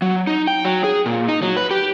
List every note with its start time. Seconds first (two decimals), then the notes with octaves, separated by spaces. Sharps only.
0.02 F#3
0.27 D#4
0.47 G5
0.65 F#3
0.84 G#4
1.06 A#2
1.28 D#4
1.42 F#3
1.57 B4
1.71 G4